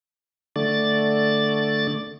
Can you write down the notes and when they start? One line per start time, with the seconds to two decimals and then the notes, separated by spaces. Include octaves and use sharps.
0.56 D3 A3 D5 A6